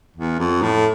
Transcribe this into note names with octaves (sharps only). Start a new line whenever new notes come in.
E2
F2
A2